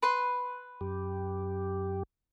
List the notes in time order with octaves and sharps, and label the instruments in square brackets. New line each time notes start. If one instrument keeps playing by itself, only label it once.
[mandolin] B4 C6
[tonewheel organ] F#2 G4